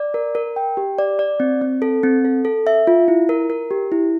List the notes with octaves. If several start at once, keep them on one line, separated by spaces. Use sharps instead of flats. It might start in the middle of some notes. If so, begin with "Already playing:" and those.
Already playing: D5
A#4
A#4
G5
G4
D5
D5
C4
C4
A4
C4
A4
A4
E5
F4
E4
A#4
A#4
G4
E4